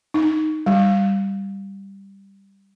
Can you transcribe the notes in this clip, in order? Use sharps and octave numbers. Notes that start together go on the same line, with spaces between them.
D#4
G3